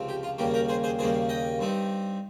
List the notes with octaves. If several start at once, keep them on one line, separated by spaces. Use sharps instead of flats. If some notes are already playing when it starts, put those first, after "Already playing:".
Already playing: C#2 C3 F3
G4
F4
D#2 C#3 G3 A#3 G4
G4 A#4
G#4 C5
G#4 C5
D#2 C#3 G3 A#3 G#4 C5
D#5 G5
G2 G3 C4 D#4